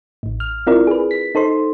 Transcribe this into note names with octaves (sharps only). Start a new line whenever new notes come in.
A1 A2
F6
C4 E4 F4 A#4 D5
G#4 B4
B6
D#4 A4 C5 C6